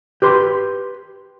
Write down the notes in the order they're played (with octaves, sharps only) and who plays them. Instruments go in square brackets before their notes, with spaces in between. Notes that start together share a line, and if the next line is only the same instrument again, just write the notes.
[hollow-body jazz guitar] G4 B4 C6